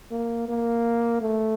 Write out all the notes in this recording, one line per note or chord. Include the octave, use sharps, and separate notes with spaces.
A#3
A#3
A3